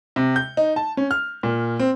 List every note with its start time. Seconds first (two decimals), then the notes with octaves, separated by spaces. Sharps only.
0.16 C3
0.36 G6
0.57 D#4
0.76 A5
0.97 C#4
1.11 F6
1.43 A#2
1.79 C4